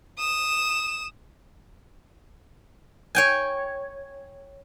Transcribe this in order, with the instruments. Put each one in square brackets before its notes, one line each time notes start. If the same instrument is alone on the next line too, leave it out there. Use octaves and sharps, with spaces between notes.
[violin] D#6 E7
[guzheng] C#5 G5 G#5